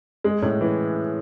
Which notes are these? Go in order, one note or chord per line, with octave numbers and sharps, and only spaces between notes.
G#3
A2
E3